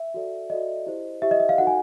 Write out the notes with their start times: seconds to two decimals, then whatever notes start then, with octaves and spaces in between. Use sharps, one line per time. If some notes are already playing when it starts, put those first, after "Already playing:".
Already playing: E5
0.14 F#4 A4 D5
0.50 F#4 A4 D5 D#5
0.86 E4 G4 C5
1.22 E4 G4 C5 E5
1.31 D#5
1.40 E5
1.49 F5
1.58 D#4 F#4 A4 F#5
1.67 G#5